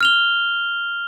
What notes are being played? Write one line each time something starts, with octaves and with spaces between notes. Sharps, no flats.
F6 F7 G7